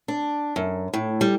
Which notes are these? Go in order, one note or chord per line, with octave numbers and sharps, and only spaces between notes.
D4
F#2
A2
G3